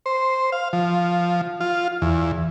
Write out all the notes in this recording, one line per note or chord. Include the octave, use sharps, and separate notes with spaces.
C5
F5
F3
F4
E2